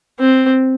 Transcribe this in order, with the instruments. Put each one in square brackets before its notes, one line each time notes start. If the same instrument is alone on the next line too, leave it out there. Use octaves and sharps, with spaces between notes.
[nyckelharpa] C4